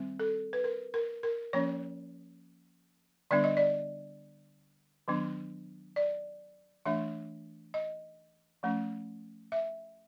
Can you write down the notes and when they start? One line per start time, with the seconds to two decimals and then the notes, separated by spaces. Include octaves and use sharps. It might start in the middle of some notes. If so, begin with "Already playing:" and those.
Already playing: D#3 G3 C4
0.19 A4
0.53 B4
0.64 A#4
0.94 A#4
1.23 A#4
1.53 F3 A#3 C#4 C#5
3.31 D3 G3 B3 D4 D5
3.44 D#5
3.57 D5
5.08 D#3 F#3 B3 D4
5.96 D5
6.86 E3 A3 D4 E5
7.74 D#5
8.63 F3 A3 C#4
9.52 E5